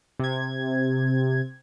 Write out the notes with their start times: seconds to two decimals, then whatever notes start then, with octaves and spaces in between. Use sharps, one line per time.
0.19 C3 G#6